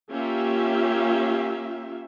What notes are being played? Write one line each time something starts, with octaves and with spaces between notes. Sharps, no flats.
A#3 C#4 F4 G4 E5